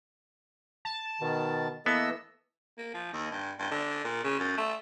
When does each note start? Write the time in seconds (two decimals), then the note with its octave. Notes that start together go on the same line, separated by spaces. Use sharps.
0.85 A5
1.21 B2 D#3
1.86 E3 A#3 B3 A4 D#5 E6
2.78 A#3
2.94 F3
3.13 D#2
3.32 G2
3.59 G2
3.71 D3
4.04 A#2
4.24 C#3
4.39 F#2
4.57 A3